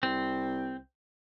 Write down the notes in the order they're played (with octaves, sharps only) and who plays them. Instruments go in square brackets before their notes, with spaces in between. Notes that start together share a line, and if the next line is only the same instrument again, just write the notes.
[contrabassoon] C2 [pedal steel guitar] C4